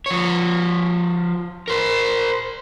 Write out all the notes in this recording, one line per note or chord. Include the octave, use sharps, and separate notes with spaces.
F3 C#5
A#4 C5